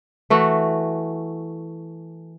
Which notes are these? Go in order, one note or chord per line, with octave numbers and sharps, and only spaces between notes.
E3 A3 F#4